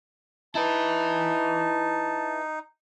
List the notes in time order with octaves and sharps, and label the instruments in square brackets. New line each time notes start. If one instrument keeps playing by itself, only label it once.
[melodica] D#4 [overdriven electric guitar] E4 B4 [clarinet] A5